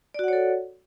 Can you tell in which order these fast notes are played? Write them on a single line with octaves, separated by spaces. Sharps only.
D5 F#4 F#5 C#5 A4